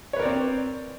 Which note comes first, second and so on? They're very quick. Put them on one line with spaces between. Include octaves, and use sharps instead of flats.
C#5 B4 A#4 D5 C4